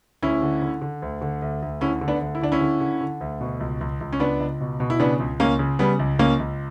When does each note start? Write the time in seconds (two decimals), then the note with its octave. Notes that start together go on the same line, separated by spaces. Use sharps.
0.22 D2 C#4 E4
0.42 D3
0.62 D3
0.82 D3
1.02 D2
1.21 D3
1.42 D2
1.62 D2
1.81 D3 C#4 E4
2.01 D3
2.08 B3 D4
2.21 D2
2.35 E4
2.42 D3 D4
2.52 C#4 E4
2.61 D3
2.81 D3
3.01 D3
3.21 D2
3.41 B2
3.60 C#2
3.81 C#2
4.01 C#2
4.13 C#4
4.20 C#2 B3 D4
4.40 C#2
4.60 B2
4.80 B2
4.90 E4
4.99 C#3 B3 D4
5.20 C#2
5.40 C#2 A#3 C#4
5.59 C#3
5.79 C#3 G3 B3
5.99 C#2
6.19 C#2 A#3 C#4
6.39 C#2